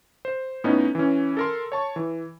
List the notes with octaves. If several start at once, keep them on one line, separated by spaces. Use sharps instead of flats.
C5
A2 B3 C#4 D#4
E3 C#4
A4 A#4 C6
C#5 A5 C#6
E3